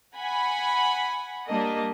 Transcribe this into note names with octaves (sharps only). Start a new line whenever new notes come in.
F#5 G#5 B5
G3 A#3 D4 D#5